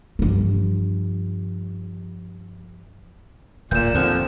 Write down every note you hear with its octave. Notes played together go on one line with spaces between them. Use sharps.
G2 F3
D1 A#2 G6 E7
D#2 D3 F3 C4